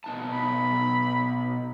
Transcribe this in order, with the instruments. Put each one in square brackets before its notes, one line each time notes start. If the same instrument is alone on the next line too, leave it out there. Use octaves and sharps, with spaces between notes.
[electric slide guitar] B2 D#4 A5
[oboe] B5